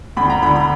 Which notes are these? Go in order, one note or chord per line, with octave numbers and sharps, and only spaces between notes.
D2 B5
A#5
D3 B5
B5